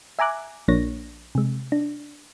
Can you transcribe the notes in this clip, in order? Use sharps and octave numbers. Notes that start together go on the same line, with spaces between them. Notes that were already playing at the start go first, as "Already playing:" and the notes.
E5 G#5 A#5 D6 F#6
A#1 F3 A#3 D4 C#5 A#6
C3 G#3
D4